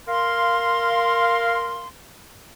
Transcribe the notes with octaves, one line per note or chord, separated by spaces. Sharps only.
A#4 F5 C6